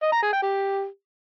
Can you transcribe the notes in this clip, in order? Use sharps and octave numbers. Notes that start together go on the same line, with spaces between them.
D#5
A#5
G#4
G5
G4